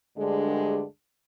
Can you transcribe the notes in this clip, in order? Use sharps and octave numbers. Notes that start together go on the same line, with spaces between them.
D2 G2 D3 G#3 D4 G#4